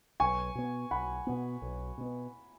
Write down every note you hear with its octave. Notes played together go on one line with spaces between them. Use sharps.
B1 G#5 C#6
B2 B3
B1 F#5 B5
B2 B3
B1
B2 B3